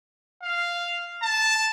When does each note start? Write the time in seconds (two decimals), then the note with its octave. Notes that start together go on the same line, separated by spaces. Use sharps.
0.43 F5
1.22 A5